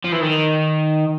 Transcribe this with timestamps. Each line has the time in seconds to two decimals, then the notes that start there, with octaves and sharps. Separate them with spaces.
0.04 F3
0.12 E3
0.21 D#3